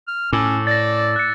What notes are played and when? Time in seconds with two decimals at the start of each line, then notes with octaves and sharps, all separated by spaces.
0.08 F6
0.33 A2 C#4 D6 E6
0.67 D5 A6 A#6
1.16 F#6 C#7